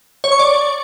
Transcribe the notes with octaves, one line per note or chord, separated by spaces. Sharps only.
C#5
C#6
D5